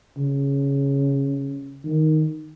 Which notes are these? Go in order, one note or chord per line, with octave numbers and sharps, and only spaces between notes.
C#3
D#3